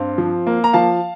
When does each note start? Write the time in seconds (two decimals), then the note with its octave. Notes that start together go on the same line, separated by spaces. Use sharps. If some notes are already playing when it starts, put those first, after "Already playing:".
Already playing: G2 C4 F5
0.18 F3
0.47 A#3
0.64 A#5
0.73 F3 F5 A5